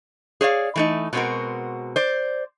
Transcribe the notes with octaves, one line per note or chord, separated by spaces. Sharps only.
G#4 C#5 D5 F5
E3 A3 D#4
B2 G#3 C4 D4 F#4 A#4
C5 D5